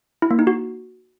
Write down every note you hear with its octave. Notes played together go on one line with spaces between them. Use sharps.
E4
A#3
D#4
F#4